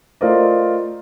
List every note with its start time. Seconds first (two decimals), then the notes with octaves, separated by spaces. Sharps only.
0.21 A3 F4 A#4 C5 D5 D#5